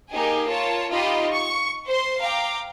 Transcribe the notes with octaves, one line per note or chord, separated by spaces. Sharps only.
A#3 D#4 G4 G#4 G#5
F4 A#4 C#5 A5
D#4 F4 G4 D#5 B5
C#6
C5 C6
F5 G5 A#5 D6